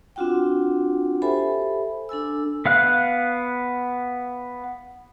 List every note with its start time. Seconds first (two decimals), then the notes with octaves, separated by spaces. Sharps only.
0.16 C4 D4 F4 F#4 F#5 G5
1.22 G4 A4 C5 E5 G#5 B5
2.09 D4 A4 G#5 E6
2.66 B3 F5 F#6